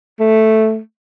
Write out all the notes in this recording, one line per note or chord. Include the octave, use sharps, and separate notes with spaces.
A3